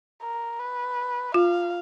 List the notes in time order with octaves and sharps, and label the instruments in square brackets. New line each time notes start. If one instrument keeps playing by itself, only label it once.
[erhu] A#4
B4
[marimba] F4 [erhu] F5